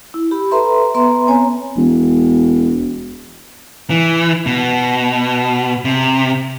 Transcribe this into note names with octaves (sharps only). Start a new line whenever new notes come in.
E4
G4 B5
A4 B4 E5 A#5 C6
B3 B4 E5 A#5 C6
B3 C4 C#5 G#5 A#5
E1
E3
B2
C3